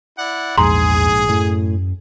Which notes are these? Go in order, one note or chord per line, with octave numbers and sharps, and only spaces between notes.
E4 D5 F#5
A#1 E2 G#2 G#4 A#5 C6
F#2 A2